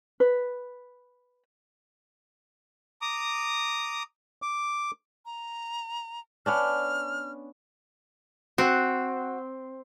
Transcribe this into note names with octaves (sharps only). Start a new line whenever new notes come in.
B4
A#5 D6 D#6
D6
A#5
B3 C#4 D4 F6
C4 F#4 F#5